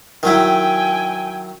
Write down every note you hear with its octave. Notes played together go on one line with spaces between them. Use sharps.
D#3 F#3 E4 G5 G#5